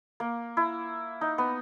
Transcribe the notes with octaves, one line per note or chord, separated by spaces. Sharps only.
A#3
E4
D#4
B3